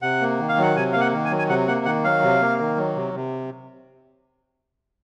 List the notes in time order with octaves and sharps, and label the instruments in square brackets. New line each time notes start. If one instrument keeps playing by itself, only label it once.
[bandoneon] C3 [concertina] F#5
[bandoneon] A#3
D#3
[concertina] F5
[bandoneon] F#3 [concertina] F#5
[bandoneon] C3 [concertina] G#5
[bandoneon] A#3 [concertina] F5
[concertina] F#5
[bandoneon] D#3
[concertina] G#5
[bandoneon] F#3
[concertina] G#5
[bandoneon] C3 [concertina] F#5
[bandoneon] A#3 [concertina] F#5
[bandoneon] D#3 [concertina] F#5
[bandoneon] F#3 [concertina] F5
[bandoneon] C3
A#3
D#3
F#3
C3
C3